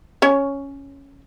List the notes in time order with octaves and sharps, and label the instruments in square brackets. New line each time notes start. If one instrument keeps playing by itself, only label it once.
[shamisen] C#4 C#5